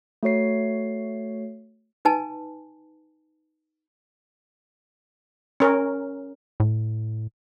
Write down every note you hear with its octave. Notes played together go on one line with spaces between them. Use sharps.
A3 F#4 C#5 C7
D#4 B4 G#5 A5
C#4 A#4
A2